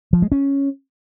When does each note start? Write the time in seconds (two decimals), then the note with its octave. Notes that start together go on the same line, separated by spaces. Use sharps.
0.13 F3
0.22 G#3
0.32 C#4